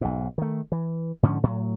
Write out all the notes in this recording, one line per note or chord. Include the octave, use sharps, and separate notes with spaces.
B1 G#2
D#3 A3
E3
G#2 D3 F3 C#4
A2 F#3